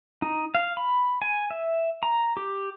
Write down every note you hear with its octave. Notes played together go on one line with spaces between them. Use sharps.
D#4
F5
B5
G#5
E5
A#5
G4